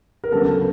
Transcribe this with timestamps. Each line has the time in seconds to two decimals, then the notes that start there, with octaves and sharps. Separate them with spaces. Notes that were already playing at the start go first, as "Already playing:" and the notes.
0.24 A#4
0.31 D2 C#3 F#3 B3 A4